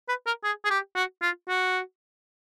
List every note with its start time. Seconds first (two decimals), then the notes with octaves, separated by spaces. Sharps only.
0.09 B4
0.27 A#4
0.44 G#4
0.65 G#4
0.70 G4
0.95 F#4
1.22 F4
1.49 F#4